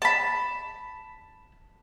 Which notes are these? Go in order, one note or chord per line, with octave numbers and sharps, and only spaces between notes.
A5 B5